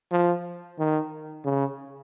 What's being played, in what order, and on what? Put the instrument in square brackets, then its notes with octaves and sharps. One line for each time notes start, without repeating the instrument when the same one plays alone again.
[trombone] F3
D#3
C#3